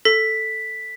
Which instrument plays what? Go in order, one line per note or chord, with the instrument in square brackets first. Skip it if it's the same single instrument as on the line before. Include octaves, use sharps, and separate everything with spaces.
[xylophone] A4 [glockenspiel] B6